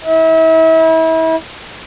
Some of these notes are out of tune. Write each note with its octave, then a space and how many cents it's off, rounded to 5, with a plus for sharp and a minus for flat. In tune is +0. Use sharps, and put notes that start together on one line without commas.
E4 -35